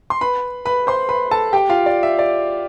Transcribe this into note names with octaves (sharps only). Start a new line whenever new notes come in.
C6
B4 B5
B4 B5
C5 C6
B4 B5
A4 A5
G4 G5
F4 F5
D5
E5
D5